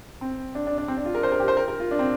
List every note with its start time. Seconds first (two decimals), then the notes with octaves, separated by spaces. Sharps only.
0.21 C4
0.55 D4
0.67 D4
0.78 D4
0.88 C4
0.97 D4
1.05 F4
1.15 A#4
1.23 C5
1.32 A#4
1.40 G4
1.48 C5
1.57 A#4
1.68 A#4
1.80 F4
1.91 D4
1.99 C4